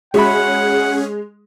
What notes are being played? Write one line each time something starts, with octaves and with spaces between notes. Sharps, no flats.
G#3 C#4 F#4 G#4 E5 F#5 B5